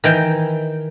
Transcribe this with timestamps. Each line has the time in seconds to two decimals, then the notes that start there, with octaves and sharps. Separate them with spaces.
0.04 D#3 E3 G5